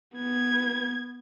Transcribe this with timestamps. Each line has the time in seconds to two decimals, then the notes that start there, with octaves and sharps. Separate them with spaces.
0.16 B3 G#6